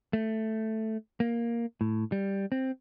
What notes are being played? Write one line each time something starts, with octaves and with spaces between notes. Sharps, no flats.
A3
A#3
A2
G3
C4